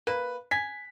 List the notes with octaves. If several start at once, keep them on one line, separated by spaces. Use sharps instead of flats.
A#3 B4
G#5 B6